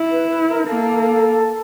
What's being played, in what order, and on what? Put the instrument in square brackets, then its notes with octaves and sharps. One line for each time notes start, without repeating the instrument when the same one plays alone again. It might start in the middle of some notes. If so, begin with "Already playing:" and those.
Already playing: [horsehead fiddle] E4
[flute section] B4
B4
A#4
[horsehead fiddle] A#3 [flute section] A4